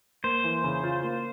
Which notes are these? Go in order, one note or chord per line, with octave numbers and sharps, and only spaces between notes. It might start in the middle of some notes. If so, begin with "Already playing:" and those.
A#3 C5
E3
C#3
F4
A#3